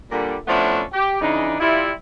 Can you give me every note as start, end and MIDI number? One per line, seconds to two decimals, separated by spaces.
0.11 0.35 46
0.11 0.35 50
0.11 0.35 55
0.47 0.82 53
0.47 0.82 57
0.47 0.82 59
0.47 0.82 61
0.47 0.82 62
0.47 0.82 64
0.93 1.17 67
1.21 1.54 49
1.21 1.54 52
1.21 1.54 62
1.21 1.54 63
1.59 1.91 55
1.59 1.91 64
1.59 1.91 65